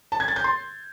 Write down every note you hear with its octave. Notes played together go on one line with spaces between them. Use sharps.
A5
G#6
A6
G6
C6